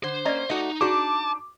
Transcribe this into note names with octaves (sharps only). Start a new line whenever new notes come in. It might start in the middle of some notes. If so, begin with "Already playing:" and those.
D3 C5
A#3 C#4 D5 D#5 A#5
A3 D#4 F#4 D5 D#5
D4 D#4 F#4 G#4 D5 A5 D6